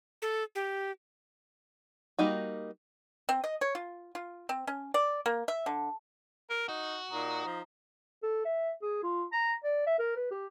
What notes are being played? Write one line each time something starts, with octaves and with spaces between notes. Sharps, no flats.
A4
G4
G3 A#3 D#4 F#4
C4
D#5
C#5
F4
F4
C4
C#4
D5
A#3
E5
D3
A#4
D#4 F#4
A#2 D#4 A#5 D#6
F3
A4
E5
G#4
F4
A#5
D5
E5
A#4
B4
G4